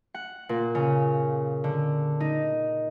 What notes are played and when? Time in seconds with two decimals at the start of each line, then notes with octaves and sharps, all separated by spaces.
0.14 F#5
0.49 A#2
0.75 C#3
1.64 D3
2.20 D#4